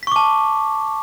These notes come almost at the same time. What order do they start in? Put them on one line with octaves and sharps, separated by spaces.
B6 C#6 D6 A5